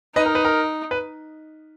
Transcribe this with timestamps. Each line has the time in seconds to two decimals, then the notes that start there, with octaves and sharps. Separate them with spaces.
0.16 D#4 B4 D#5
0.26 A#4
0.35 B4
0.45 A#4
0.91 B4